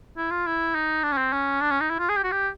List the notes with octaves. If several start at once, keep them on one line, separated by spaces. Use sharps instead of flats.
E4
F4
E4
D#4
D4
C#4
C4
C#4
D4
C#4
D#4
E4
F4
G#4
G4
F#4
G4